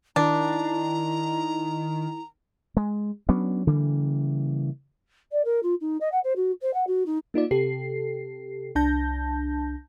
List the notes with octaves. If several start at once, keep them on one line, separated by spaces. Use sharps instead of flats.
D#3 D4 E4 A#5
G#3
F#3 B3 C#4 D4
C#3 E3 G3 A#3
D5
A#4
F4
D#4
D#5
F#5
C5
F#4
C5
F#5
F#4
D#4
A#3 D#4 F4 D5
C3 G4 A4 C7
C2 D4 A5 G6 A#6